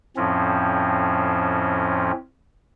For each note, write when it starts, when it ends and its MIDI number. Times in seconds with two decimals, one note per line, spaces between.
0.17 2.12 41
0.17 2.12 45
0.17 2.12 53
0.17 2.12 60
0.17 2.12 61